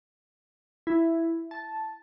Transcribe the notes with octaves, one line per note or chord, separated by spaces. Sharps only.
E4
A5